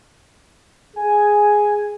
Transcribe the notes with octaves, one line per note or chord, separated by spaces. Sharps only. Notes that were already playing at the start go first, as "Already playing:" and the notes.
G#4 G#5